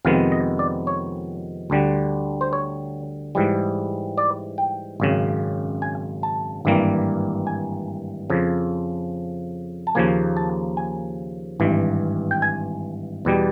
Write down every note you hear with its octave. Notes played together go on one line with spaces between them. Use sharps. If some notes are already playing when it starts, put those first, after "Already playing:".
F2 C3 D#3 G#3 B3 F5
D#5
D5
C#5
D2 D3 G3
C5
C#5
G#2 E3 G3
D5
G5
G#1 F#2 C#3
G#5
A5
G#1 G2 E3 G3 A#3
G#5
F2 C#3 F3
A5
D#2 C#3 F3 A#3 G#5
A5
G#5
G#1 G2 E3
G5
G#5
E2 B2 G3